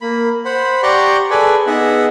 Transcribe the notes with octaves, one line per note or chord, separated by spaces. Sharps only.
A#3 B5
C5 F#5 B5
G4 D5 F#5 A#5 C6 C#6
G#4 A4 B4 D5 G#5
B3 D#4 G#4 E5 F#5